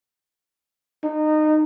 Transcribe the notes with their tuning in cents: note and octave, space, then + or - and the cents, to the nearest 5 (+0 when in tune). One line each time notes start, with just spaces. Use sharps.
D#4 -20